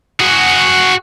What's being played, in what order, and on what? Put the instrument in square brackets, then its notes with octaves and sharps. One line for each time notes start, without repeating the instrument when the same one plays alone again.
[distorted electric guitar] F#4 G#4